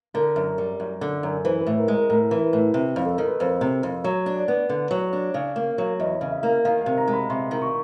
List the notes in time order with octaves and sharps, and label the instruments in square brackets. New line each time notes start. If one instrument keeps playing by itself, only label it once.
[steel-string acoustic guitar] D3 [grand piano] A#4
[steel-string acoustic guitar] F#2
G3
F#2
D3
F#2
[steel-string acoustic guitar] E3 [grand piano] C5
[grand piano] B4
[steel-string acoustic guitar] A2
[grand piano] A#4
[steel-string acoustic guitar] G#3
[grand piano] A#4
[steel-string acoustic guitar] A2 [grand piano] A#4
[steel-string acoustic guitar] E3
[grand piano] B4
[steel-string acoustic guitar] A2
[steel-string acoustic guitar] C3 [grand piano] B4
[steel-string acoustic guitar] F2
[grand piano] A4
[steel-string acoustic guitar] D#3 [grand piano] A#4
[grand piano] B4
[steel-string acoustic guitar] F2 [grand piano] C5
[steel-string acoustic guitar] C3
F2
[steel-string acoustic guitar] F#3 [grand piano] C#5
[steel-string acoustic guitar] D4
[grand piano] D5
[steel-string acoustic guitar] B3
D3
F#3
D4
C#3
A#3
F#3
[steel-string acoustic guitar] E2 [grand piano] D#5
[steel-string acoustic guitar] C#3
[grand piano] E5
[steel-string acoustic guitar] A#3
[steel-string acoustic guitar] D#3 [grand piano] F5
[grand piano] F5
[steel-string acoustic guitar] C3
[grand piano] A#5
[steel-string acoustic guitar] G#3
[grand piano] B5
[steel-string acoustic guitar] C3 [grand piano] C6
[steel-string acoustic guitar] D#3
[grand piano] C#6